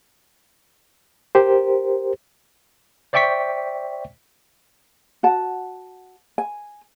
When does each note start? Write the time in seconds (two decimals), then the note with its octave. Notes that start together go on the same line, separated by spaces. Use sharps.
1.35 G4 A#4 C5
3.13 C5 D5 E5 G5 C#6 B6
5.23 F#4 F#5 A5
6.38 G#5